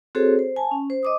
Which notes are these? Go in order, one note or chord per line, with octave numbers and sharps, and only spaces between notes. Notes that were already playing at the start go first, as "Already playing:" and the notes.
C4 F#4 G#4 A4 C5 C#5
C5
G#5 A5
C#4
C5
D#5 D6 D#6